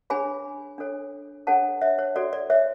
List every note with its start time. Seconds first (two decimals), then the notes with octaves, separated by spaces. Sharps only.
0.10 D4 G#4 C#5 G#5 B5
0.78 D4 A4 C#5
1.47 D4 A4 C#5 F#5 A5
1.81 C#5 E5
1.98 C#5
2.16 F#4 A4 C#5 D5
2.33 D5
2.50 C#5 E5